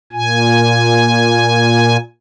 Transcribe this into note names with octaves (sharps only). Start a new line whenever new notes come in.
A#2 G#5